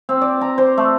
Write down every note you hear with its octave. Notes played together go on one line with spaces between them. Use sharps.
C4
D5
A#5
C5
A3